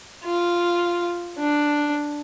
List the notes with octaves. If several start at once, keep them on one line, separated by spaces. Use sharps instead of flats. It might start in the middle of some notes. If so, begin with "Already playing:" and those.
F4
D4